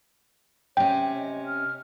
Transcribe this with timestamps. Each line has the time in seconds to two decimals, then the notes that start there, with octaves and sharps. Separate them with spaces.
0.77 C3 C#4 C#5 G5
1.18 D#5
1.46 F6